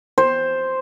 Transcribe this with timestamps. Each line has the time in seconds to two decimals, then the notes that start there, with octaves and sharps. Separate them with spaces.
0.18 C5